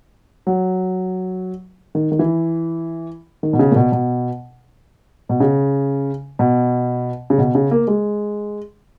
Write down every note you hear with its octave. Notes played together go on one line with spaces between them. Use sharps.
F#3
D#3
D#3
E3
D#3
B2
C#3
A#2
B2
B2
B2
C#3
B2
C#3
B2
C#3
A#3
G#3